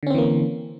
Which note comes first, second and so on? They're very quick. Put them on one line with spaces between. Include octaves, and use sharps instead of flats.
D3 C#4 C4 E3 A#3